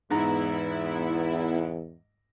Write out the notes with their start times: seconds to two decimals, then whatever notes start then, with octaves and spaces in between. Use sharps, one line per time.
0.10 E2 G#2 B3 E4 A#5